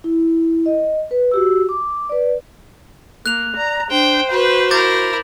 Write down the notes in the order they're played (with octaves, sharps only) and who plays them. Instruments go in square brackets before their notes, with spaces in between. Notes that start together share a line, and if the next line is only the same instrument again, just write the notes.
[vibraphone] E4
D#5
B4
F#4 G4 E6
D6
B4 D5
[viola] A#3 [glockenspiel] F#6 F7
[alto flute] D5 [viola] A#5
[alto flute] D4 [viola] C5 [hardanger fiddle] G5
[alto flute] F#4 [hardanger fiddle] B4
[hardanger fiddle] E4 A#4 [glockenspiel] D6 G6 A6